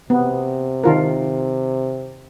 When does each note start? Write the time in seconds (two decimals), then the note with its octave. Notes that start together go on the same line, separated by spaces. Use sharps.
0.10 C3 B3
0.84 D#3 F4 A#4